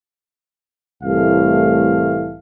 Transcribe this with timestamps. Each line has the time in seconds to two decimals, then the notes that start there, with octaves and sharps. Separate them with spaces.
1.04 C2 A2 E3 A3 F5